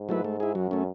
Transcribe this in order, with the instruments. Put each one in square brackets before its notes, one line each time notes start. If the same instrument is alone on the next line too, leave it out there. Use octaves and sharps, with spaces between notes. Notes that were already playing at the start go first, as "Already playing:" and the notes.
Already playing: [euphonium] G#2
[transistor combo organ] F#3 A3 E4 B4
A3
E4 G#4
[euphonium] F#2 [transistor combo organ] F#3
[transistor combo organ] A3 C#4